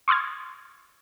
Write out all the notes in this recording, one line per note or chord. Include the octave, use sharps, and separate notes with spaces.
C6 C#6 D#6 F6 G#6